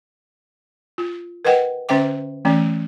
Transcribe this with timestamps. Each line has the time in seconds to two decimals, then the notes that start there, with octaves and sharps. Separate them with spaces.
0.98 F4
1.45 A#4 B4 D#5 F#5 G5
1.89 D3 C#4 C5 E5 G5 D6
2.45 E3 A3 C#4 D5